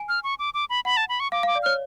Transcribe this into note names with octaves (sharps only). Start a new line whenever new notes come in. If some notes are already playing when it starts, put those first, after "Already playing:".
Already playing: G#5
F6
C#6
D6
D6
B5
F#5 B5
A5
B5
C#6
F5 D6
F5 D6
D5
C#5 F6